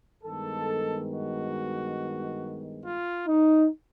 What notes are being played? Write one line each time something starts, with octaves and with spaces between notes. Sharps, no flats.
G2 D#3 G#3 B3 A4
F#4
F4
D#4